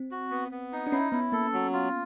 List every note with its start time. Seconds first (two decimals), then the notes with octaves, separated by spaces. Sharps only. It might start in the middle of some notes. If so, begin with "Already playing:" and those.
Already playing: C4
0.12 F#4
0.31 B3
0.52 B3
0.73 D#4
0.87 D4
0.92 C#4 E4
1.12 B3 E4
1.32 A#3 A4
1.53 F#3
1.73 F4